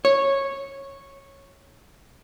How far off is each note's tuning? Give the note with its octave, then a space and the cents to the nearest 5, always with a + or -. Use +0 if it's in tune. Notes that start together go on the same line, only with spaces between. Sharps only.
C#5 -10